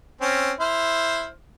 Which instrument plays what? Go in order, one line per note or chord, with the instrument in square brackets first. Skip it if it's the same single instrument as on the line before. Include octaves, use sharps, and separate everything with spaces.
[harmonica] C4 C#4
E4 C5 F6